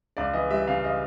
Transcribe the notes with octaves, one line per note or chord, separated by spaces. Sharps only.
C#2 D5
E3 D#5
G3 E5
C#3 F5
D#5